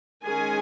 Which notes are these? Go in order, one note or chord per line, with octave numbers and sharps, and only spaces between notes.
D#3 G#3 C#4 G#4 G#5